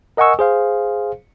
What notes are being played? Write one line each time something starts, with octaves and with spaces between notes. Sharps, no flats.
A#4 D#5 F#5 G#5 C#6 E6
G#4 C5 F5